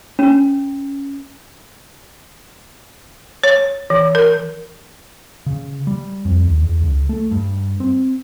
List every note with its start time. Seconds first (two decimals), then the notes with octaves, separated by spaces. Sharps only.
0.19 C#4
3.43 C#5
3.90 E3
4.15 A#4
5.46 C#3
5.87 G3
6.25 F2
6.44 D#2
6.63 E2
6.82 C#2
7.09 A3
7.31 G2
7.80 C4